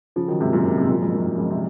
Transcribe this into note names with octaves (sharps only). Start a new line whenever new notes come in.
C#3 F3
D#3 F#3
G#2 C3
F#2 A#2
G#2 C3
G#2 C3
F#2 A#2
F2 G#2
F#2
F#2
F2 G#2
C3